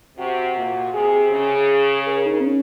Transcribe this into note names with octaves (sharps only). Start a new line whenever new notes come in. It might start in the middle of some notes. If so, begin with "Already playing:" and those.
C3 F#4
A#2
C3 G#4
C#3 G#4
A#4
D#4
C4
C#4